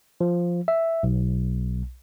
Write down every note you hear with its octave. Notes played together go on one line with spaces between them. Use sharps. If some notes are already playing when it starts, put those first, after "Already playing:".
F3
E5
B1